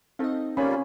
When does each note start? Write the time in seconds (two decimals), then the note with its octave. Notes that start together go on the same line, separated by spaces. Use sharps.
0.19 C4 D#4 A4 D#5 F5
0.57 G3 A#3 C#4 F4 C#5 G#5 B5